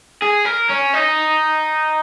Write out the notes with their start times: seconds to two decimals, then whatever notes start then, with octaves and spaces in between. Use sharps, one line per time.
0.22 G#4
0.45 A#4
0.69 C#4
0.93 D#4